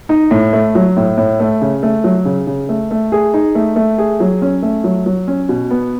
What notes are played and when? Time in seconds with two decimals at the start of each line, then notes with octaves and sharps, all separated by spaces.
0.09 D#4
0.31 A2
0.53 A3
0.75 F#3
0.97 A2
1.17 A2
1.40 A3
1.61 C#3
1.83 A3
2.04 F#3
2.25 C#3
2.47 C#3
2.69 A3
2.91 A3
3.12 G#4
3.34 D#4
3.55 A3
3.76 A3
3.98 G#4
4.20 F#3
4.42 C#4
4.62 A3
4.84 F#3
5.06 F#3
5.28 C#4
5.49 B2
5.70 B3